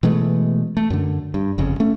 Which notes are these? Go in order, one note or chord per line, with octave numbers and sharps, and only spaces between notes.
B2 E3 G#3 A3
A3
F#2 D3
G2
G1 F2 C#3
A3 C#4